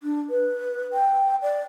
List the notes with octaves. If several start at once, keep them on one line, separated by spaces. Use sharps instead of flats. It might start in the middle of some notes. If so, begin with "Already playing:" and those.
D4
B4
G5
D5